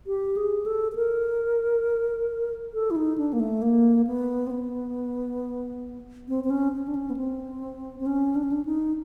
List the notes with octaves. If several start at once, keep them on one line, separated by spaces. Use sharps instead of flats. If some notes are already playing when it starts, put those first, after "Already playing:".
G4
G#4
A4
A4
A#4
A4
E4
D#4
D4
A#3
A3
A#3
B3
C4
B3
C4
C4
C#4
C#4
D4
C#4
B3
C4
C4
C#4
D4
C#4
D4
D#4